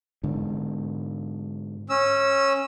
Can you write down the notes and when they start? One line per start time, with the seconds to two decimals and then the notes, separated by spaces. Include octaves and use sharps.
0.23 G#2 D3
1.89 C#4 E6